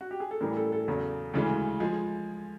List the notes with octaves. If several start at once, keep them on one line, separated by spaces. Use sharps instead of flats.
F#4
G4
G#4
A4
A2 E3 G3 A#4
A4
A4
E2 C#3 F#3
D2 C#3 E3 G#3
F3 G#3 G#4